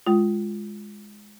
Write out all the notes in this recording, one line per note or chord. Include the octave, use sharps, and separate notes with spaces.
G#3 F4